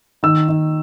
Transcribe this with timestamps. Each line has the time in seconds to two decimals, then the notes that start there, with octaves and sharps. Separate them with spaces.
0.23 D#3 E6
0.48 D#3